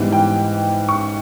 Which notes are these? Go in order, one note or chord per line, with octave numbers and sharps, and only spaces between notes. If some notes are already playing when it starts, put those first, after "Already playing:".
Already playing: G#2 E3 G3 B3 E4
G5
C#6